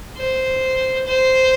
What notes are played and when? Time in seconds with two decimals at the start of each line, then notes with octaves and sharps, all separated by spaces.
0.17 C5
1.06 C5